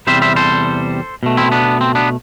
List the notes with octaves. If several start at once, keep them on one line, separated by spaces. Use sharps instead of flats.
E2 C3 G3 C5 E5
C5 E5
A4 C5
B2 A3
C4 E4
B3 D4
C4
B3 D4